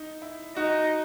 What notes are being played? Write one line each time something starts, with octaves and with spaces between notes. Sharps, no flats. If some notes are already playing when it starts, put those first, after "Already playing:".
Already playing: D#4
E4
D#4 F#4